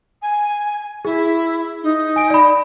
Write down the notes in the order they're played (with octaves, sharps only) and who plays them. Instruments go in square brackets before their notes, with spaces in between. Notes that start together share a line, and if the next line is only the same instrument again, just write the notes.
[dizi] G#5
[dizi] E4 [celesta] G#4
[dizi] D#4
[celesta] G#5 D7
D5 B5